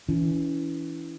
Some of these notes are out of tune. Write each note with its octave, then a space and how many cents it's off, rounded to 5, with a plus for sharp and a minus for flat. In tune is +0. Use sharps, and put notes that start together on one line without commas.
E3 -5 C#4 +30